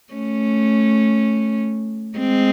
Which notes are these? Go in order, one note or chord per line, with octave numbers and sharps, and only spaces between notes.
A3 C#4
G#3 C4